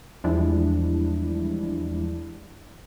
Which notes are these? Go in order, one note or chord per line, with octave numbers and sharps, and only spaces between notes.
E2 F3 G3 G#3 D4 E4